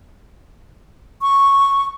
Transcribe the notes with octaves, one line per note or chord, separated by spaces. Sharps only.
C#6